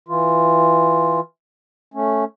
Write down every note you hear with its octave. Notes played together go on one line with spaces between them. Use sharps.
E3 F4
A3 C#4